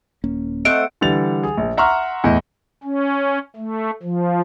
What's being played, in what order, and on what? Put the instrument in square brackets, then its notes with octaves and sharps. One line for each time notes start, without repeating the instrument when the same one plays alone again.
[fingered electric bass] D#1 A#3 C#4
[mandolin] A3 C4 F#5 [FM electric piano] D#5 [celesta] D7
[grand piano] D3 E3 G3 A6 F7
G#4
A#1
E5 F#5 A#5 C6 C#6 F6
E2 A2 D#5
[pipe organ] C#4
A3
F3